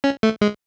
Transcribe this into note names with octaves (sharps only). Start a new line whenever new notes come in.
C#4
A3
G#3